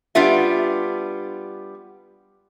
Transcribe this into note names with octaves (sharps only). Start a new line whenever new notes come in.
G3 B3 D4 F4 E5